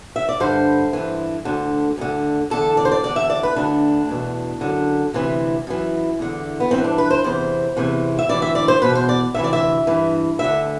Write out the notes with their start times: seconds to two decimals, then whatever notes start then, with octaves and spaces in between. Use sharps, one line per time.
0.16 E5
0.29 D5
0.40 G2 D3 C5
0.93 G2 E3
1.45 D2 D3
1.98 D2 D3
2.50 E2 D3 A4
2.77 D5
2.85 C5
2.91 D5
3.03 E2 D3 D5
3.16 E5
3.30 D5
3.43 B4
3.56 D2 D3 D4
4.09 E2 B2
4.61 F#2 D3
5.13 D2 C3 E3
5.67 F#2 E3
6.19 E2 D3
6.60 B3
6.71 G2 E3 C4
6.84 D4
6.98 B4
7.10 C5
7.24 E2 C3 E3 C5
7.76 E2 C3 E3
8.19 E5
8.29 C3 E3 D5
8.34 D2
8.42 E5
8.55 D5
8.68 C5
8.82 E2 B2 B4
8.95 C5
9.09 D5
9.35 D2 C3 E3 E5
9.44 D5
9.53 E5
9.87 G2 E3
10.39 D2 D3 E5